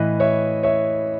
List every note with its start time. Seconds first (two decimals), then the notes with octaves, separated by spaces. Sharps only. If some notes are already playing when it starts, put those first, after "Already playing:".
Already playing: A2 E3 B4 D#5
0.20 C#5 E5
0.63 C#5 E5